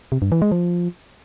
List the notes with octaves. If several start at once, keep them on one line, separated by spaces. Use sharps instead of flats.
C3
G2
E3
G#3
F3